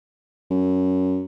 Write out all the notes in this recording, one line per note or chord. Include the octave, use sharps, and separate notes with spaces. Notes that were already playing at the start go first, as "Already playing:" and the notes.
F#2